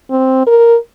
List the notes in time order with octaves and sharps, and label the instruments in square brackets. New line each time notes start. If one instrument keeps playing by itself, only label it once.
[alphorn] C4
A#4